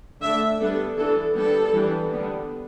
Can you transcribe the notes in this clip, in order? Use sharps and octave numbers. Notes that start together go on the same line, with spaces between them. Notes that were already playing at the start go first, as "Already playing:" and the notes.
D3 A3 D4 E5
G3 B3 D4 A4
E3 B3 D4 A4
D3 G3 B3 D4 A4
E3 G3 B3 D4
D3 G3 B3 D4